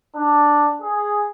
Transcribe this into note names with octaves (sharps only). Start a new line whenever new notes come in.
D4
G#4